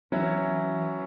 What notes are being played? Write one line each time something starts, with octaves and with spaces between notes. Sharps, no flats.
E3 F#3 C#4 E4
E3